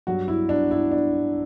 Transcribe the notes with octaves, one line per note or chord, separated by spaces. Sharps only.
G2 F#3 F#4
E4
D4
E4
D4